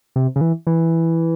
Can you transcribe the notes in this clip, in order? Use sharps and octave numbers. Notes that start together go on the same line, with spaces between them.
C3
C#3
E3
E3